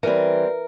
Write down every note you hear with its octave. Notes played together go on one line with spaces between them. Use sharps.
E3 G3 C4 A#4